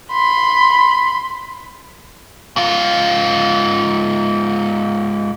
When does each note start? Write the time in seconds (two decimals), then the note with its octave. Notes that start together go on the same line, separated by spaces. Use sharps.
0.12 B5 C6
2.56 G#2 F4